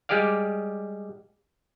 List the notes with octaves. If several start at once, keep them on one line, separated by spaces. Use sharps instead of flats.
G3 G#3 G4 G#4 D5 F5